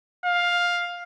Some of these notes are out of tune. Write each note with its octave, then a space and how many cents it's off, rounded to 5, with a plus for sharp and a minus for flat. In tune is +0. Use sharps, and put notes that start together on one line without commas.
F5 +10